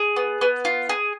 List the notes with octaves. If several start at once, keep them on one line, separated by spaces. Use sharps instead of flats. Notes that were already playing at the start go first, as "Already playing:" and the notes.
Already playing: G#4
B3
B3
F4
G#4